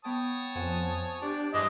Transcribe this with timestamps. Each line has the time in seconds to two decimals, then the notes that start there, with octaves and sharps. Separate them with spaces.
0.05 B3 C#5 G5 A5 D#6
0.55 F2 C5 F#5 G#5
1.22 D4 G4 D5
1.54 G2 E3 G#3 D4 D#5